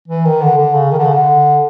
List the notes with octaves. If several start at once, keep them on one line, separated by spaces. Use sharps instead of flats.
E3
D#3
D3
D3
C#3
D#3
D3
C#3
D3